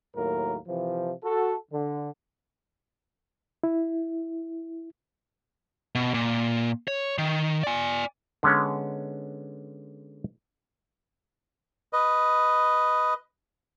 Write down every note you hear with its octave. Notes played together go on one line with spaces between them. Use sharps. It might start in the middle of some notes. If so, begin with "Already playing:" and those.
D#2 A2 F#3 A#3 A#4
C3 E3 F3
F#4 A4
D3
E4
B2
A#2
C#5
D#3
D5 G#5
D3 G#3 B3 C#4
B4 D#5